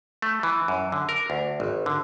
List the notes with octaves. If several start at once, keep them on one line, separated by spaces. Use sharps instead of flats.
A3
E3
F#2
D3
A#4
D2
G#1
D3